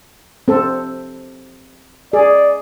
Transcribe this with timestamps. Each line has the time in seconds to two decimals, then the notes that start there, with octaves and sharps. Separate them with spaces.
0.48 C4 A4
2.13 G#4 D5